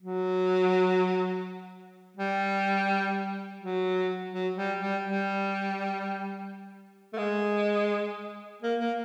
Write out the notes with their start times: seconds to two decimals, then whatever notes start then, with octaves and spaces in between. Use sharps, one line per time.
0.02 F#3
2.17 G3
3.60 F#3
4.32 F#3
4.56 G3
4.80 G3
5.04 G3
7.13 A3
7.18 G#3
8.62 A#3
8.80 A#3